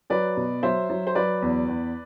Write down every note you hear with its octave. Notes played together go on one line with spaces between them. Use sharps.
F#3 B4 D5
B2
F#3 C5 E5
F#3
C5
F#3 B4 D5
E2
E2